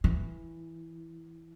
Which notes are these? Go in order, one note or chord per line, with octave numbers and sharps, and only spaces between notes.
E3